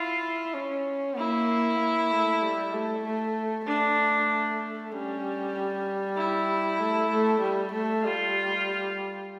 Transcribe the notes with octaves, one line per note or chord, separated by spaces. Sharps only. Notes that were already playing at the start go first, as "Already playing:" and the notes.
Already playing: E4 F4
C#4
A#3 E4
A#3
A3
G3
A3
A3
A3 D4
G3 C#4
E4
A3
A3
G3
A3
G3 F4